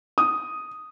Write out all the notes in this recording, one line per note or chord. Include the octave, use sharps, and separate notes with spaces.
D#6